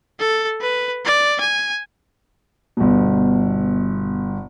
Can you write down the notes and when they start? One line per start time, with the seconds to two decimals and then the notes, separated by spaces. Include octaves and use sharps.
0.19 A4
0.61 B4
1.05 D5
1.40 G#5
2.77 G1 B2